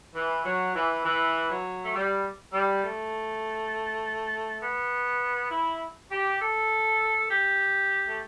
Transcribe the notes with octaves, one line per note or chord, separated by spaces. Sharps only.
E3
F#3
E3
E3
F#3
A3
G3
G3
A3
B3
E4
G4
A4
G4
A3